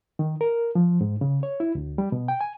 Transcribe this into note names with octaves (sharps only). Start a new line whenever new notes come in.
D#3
A#4
F3
G#2
C#3
C#5
E4
D2
G3
B2
G5
G#5